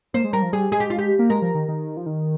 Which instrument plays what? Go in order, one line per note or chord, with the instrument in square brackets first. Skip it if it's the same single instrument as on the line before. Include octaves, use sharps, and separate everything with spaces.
[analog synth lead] A#3 [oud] C5
[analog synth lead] G#3
[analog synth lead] G3 [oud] A#4
[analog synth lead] F3
[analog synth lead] G3 [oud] G#4
[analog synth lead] G#3 [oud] G#4
[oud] G4
F4
G4
[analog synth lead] A#3
[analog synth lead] G#3 [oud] A#4
[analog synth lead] F3
D#3
D#3
F3
D#3